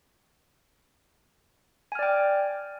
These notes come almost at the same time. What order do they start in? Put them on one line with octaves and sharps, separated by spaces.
G#5 F6 D5 G5